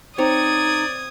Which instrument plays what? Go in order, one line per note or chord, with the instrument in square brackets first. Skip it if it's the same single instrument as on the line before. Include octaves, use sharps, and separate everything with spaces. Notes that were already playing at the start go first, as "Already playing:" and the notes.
[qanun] C4 C#5 A#5 [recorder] D#4 [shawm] D5 [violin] D#6 G#6